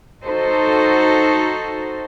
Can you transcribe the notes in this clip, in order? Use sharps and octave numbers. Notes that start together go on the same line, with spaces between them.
D#4 F#4 A4 C5